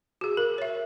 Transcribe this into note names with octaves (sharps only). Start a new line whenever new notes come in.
F#4 G#4
A#4
C#5 E5